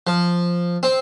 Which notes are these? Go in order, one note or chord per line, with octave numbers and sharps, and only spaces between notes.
F3
C4